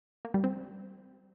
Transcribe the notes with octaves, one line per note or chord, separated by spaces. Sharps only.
A#3
G3
C4